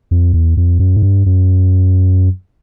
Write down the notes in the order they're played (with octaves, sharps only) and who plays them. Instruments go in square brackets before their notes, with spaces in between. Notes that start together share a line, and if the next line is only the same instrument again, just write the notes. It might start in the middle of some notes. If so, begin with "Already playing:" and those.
[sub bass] F2
E2
F2
F#2
G#2
G2
F#2